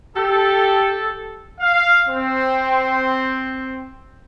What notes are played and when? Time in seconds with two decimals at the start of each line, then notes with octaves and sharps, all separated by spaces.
0.17 G4 A4
1.60 F5
2.08 C4